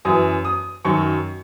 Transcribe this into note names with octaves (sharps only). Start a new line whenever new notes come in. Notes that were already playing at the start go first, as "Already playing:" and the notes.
F#2 E3 D#6
D#6
F#2 D#3 F#3 C#6